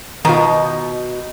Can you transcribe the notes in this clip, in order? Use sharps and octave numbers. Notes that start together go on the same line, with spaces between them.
B2 D#3 D#4 F4 A#5